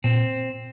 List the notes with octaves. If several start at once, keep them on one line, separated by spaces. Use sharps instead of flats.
A#2 C4